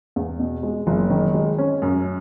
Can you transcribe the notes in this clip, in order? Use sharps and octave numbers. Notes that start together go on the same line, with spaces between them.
E2
B2
G#3
F#1
D#3
G#3
C#4
F#2